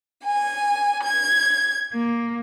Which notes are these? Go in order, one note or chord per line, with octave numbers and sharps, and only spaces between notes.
G#5
G#6
A#3